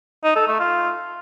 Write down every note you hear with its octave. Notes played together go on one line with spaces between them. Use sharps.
D#4
A4
A3
F4